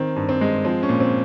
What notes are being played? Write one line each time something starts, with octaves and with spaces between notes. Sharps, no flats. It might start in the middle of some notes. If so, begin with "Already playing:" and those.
Already playing: D#3 C4
G2
C4
G#3
F3 C4
C#4
A#2
C4